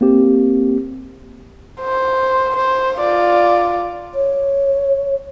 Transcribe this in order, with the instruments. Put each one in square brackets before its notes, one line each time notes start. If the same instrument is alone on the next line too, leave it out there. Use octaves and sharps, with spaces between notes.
[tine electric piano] A#3 C4 G4
[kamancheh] C5
C5
F4 D5
[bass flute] C#5